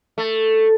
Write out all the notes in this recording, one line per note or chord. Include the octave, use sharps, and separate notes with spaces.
A3